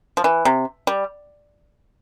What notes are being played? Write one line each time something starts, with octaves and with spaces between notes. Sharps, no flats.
F3
E3
C3
G3